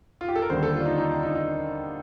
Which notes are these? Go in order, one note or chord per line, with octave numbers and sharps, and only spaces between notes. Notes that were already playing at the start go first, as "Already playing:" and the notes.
F4
G4
A4
A#4
D#2 D3 G3 C5
A4
F4
D4
D#4
D#4
D4
D#4
D#4